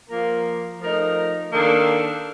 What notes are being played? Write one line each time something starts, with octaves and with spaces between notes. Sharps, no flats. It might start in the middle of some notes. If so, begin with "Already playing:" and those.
F3 A#3 F4 A#4
F3 A3 D#4 A#4
D#3 A#3 D4 A4